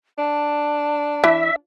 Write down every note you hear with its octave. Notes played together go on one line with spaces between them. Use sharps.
D4 A5
E3 E5